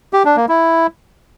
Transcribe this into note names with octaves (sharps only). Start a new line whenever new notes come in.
G4
D4
A#3
E4